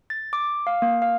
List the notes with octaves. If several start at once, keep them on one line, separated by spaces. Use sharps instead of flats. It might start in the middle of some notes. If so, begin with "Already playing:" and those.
A6
D6
F5
A#3
F5